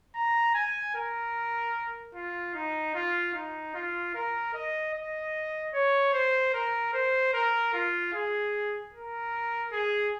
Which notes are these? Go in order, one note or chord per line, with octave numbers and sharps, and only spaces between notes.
A#5
G#5
A#4
F4
D#4
F4
D#4
F4
A#4
D#5
D#5
C#5
C5
A#4
C5
A#4
F4
G#4
A#4
G#4